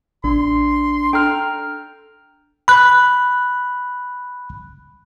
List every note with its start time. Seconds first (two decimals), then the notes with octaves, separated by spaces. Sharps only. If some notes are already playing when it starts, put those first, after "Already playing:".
0.24 A1 D4 C6
1.13 D4 A4 G5 A#5 F6
2.68 B5 F#6